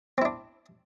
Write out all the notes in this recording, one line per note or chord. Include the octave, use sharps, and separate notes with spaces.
C4 D4 E4